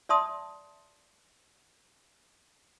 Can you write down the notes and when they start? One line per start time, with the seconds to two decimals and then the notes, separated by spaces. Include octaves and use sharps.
0.09 D5 E5 A5 C6 D#6